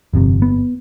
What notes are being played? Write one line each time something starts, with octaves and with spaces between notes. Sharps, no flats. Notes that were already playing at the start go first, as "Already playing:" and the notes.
G1 F2 C3
B3